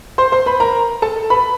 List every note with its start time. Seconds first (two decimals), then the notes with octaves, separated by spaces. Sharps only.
0.18 C5 C6
0.32 C5 C6
0.46 B4 B5
0.60 A#4 A#5
1.02 A4 A5
1.30 B4 B5